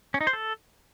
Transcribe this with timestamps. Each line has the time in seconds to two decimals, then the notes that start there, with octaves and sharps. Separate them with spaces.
0.14 C#4
0.21 D#4
0.27 C5
0.33 A4